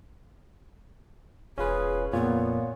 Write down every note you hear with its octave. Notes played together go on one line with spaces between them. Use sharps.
E1 C#4 F4 G#4 B4
F2 A#2 B3 F4 C#5